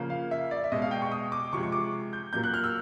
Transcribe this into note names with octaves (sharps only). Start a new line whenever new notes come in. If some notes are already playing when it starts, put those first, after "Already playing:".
Already playing: C#3 F3 A#3
F5
E5
D5
E5
B2 G#3 D#5
F5
G5
C#6
D#6
D6
C3 F3 G#3 C#6
C#6
D6
G6
A#2 F#3 A#3 G6
F#6
F6
E6